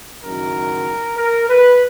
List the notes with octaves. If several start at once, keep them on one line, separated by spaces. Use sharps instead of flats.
F#1 F#2 D#3 A#4
A#4
B4